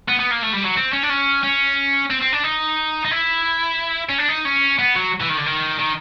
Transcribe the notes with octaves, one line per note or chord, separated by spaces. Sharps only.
B3
B3
A#3
A3
G3
F#3
C4
C#4
D4
C#4
C#4
C4
C4
D4
D#4
D#4
E4
C#4
D4
D#4
C#4
B3
F#3
E3
D#3
D3
D#3
D#3